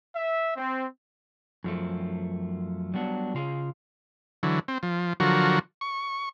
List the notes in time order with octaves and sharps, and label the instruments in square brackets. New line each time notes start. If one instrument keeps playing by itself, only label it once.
[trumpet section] E5
C4
[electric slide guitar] F#2 F3 A3
F#3 G3 B3 D4 F#4
C#3 F4 G#4
[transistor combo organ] D3 E3 F#3
C4
F3
D3 F3 F#3 F#4 A#4
C#6